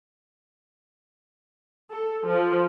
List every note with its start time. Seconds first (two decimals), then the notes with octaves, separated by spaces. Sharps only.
1.91 A4
2.26 F3